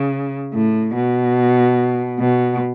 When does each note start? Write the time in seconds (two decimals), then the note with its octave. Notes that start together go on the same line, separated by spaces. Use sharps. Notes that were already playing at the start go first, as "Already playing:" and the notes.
Already playing: C#3
0.53 A2
0.95 B2
2.19 B2